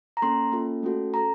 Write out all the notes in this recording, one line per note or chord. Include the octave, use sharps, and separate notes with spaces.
A#5
A#3 C#4 A4 C6
A#3 C#4 F4 A4
A3 C#4 F#4 A4
C#4 A4 A#5